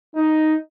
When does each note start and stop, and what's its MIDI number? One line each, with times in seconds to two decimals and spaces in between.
0.16 0.54 63